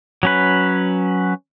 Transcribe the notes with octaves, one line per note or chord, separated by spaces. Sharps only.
F#3 C#4 B4